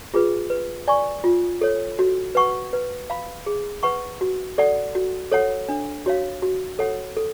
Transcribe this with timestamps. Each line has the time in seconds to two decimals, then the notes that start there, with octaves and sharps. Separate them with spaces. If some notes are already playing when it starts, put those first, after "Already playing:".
0.14 F4 G#4 B4
0.50 B4
0.88 D5 G#5 C#6
1.24 F4
1.61 A4 C#5
1.99 F#4
2.35 B4 F#5 C#6
2.73 B4
3.10 F5 B5
3.46 G#4
3.83 B4 F#5 C#6
4.21 F#4
4.58 A4 D5 F#5
4.95 F#4
5.32 A4 C#5 F#5
5.69 D4
6.06 F#4 C#5 F5
6.42 F#4
6.79 A4 C#5 F#5
7.17 A4